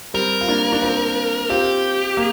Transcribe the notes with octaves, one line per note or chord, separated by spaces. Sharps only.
G3 C4 A#4
F4
A#3 D4
D4
C4 F4
C4 F4 G4
A#3